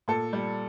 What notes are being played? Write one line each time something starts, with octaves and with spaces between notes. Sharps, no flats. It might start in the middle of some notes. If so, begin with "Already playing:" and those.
A#2 A4
G3